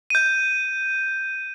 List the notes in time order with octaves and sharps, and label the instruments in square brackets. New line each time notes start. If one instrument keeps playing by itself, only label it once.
[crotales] G6 D#7